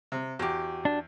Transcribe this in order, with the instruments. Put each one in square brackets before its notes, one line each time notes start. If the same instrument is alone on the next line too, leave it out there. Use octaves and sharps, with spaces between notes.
[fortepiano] C3
[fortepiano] E2 [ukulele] F#4 G4
[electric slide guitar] D4